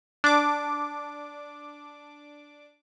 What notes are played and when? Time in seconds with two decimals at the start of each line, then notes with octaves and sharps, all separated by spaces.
0.24 D4 D6